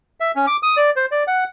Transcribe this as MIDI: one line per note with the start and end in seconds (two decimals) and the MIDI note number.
0.20 0.31 76
0.36 0.46 61
0.47 0.57 86
0.63 0.77 87
0.77 0.90 74
0.96 1.06 72
1.11 1.23 74
1.27 1.44 78